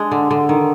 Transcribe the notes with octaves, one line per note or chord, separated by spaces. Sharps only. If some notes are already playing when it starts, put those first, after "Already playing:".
Already playing: G#3 D4
D3
D3
D#3